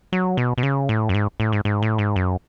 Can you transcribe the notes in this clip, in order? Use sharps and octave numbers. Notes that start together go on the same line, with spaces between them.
F#3
B2
B2
C#3
A2
F#2
G#2
A2
G#2
G#2
A2
G#2
F#2